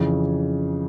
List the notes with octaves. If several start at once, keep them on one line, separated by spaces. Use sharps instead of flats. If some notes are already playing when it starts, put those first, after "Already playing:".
Already playing: F2 C#3 E3